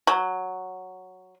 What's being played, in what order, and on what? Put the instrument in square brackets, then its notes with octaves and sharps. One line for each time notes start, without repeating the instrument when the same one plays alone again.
[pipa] F#3